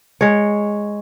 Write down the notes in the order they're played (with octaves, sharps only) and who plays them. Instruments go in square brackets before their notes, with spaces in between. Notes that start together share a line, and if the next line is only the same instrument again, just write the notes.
[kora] G#3 C#5